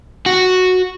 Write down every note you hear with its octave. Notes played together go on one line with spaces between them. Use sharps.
F#4